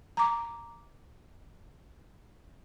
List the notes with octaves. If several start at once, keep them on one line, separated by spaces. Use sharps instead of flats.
A#5 D6